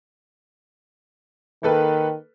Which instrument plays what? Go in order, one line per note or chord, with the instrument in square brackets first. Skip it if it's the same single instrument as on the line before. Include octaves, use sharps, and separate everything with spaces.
[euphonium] D#3 [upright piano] A#3 A4 B4